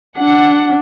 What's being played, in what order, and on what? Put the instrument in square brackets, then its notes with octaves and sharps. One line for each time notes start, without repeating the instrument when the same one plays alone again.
[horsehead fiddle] D4 [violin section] F#5